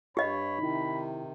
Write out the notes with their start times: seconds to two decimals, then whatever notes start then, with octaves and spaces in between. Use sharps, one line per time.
0.17 G2 G4 C#5 D#5 B5
0.59 C3 D#3 D#4 E4